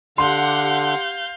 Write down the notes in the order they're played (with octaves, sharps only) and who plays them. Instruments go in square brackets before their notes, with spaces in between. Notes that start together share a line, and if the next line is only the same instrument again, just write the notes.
[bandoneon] D3 [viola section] G4 F#5 [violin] F5 G6 [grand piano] C6